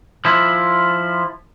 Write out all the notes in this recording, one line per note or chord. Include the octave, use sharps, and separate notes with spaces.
F3 E4